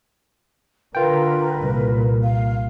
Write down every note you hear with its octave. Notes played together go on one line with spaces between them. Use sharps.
D3 F4 A#4 B4 G5
C2 A#2
F5